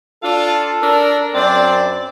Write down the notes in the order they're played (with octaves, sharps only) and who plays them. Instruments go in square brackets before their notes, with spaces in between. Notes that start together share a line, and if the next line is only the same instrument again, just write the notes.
[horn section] D4 F4 [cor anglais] A4
[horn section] D4 A#4
[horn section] F#2 D4 D5 [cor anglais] C4